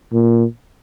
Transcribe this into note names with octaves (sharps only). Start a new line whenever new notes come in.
A#2